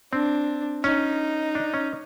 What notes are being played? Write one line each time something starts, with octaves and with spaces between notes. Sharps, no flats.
C4 D4
C#4 D#4
D4
C#4